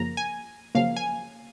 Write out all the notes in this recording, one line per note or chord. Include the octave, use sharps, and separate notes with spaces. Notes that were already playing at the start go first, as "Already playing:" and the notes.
Already playing: F#2 C#3 F3 A#3 A#5
G#5
F#2 C#3 F3 A#3 F5
G#5